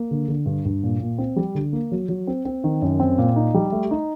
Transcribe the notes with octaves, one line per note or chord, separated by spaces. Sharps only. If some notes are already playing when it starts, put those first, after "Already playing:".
Already playing: A#3
D3
D3
G2
G2
A#2
A#2
C4
G3
D3
A#3
F#3
F#3
C4
C4
D#3
F#2
C4
A#2
D#4
G3
A3
D#4